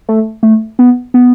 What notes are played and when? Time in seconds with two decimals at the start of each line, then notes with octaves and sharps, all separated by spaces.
0.09 A3
0.43 A3
0.79 B3
1.14 B3